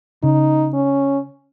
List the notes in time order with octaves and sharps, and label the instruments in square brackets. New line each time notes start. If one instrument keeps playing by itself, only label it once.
[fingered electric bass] C#3 [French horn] D#4
[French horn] C#4